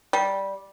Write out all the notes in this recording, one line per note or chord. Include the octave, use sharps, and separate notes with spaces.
G3